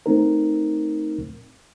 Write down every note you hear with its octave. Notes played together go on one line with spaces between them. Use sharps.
A3 C4 D#4 A#4